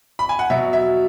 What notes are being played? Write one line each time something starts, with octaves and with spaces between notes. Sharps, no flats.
B5
G#5
F#5
B2 F#3 E5
E5